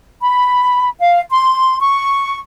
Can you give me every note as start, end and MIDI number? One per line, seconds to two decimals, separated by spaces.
0.21 0.88 83
0.98 1.19 77
1.30 1.78 84
1.80 2.37 85